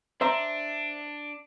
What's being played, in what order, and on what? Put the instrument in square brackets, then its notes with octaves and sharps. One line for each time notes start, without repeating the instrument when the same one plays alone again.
[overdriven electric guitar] D4 [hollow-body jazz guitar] C5 E5 A#5